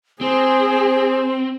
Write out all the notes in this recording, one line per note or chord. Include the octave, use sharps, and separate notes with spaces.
C4 G#4 C5